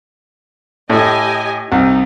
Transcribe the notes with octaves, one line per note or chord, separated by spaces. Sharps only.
A2 G4 D#5 G#5
C2 D#4